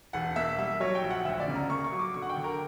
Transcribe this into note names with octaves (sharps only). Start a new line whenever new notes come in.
E1 F#5
A#3 E5
G3 E5
F#3 C#5
G5
A#1
F#5
D2 E5
D5
C#3
A#5
A#3 C#6
C#6
F#3
D6
D3 C#6
F#5
G5
D3
A#4